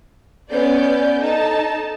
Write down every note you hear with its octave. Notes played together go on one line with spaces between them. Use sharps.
B3 C#4 D5 G6
D#4 A4 A5